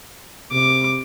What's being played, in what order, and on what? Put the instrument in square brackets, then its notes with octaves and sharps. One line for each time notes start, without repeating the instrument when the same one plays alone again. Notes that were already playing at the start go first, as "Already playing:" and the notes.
[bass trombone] C3 [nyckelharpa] D6